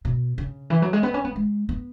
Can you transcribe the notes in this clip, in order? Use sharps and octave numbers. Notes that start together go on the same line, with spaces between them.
B2
C#3
E3
F#3
G#3
B3
C#4
B3
G#3
B3